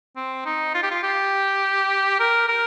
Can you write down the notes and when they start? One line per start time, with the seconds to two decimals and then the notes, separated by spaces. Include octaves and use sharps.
0.16 C4
0.45 D#4
0.75 F4
0.83 G4
0.91 F4
1.03 G4
2.20 A#4
2.49 A#4